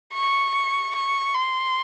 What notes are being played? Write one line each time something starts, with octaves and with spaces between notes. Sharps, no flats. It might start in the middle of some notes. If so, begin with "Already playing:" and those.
C#6
C#6
C6